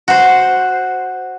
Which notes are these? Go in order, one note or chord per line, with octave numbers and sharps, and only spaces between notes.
F#4 C5